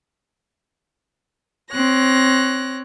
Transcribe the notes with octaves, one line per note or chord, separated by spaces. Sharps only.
C4 C#5 F#6 A#6